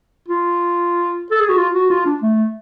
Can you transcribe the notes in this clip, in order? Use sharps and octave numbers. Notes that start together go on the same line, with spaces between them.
F4
A4
G#4
F#4
F4
F#4
F4
D4
A3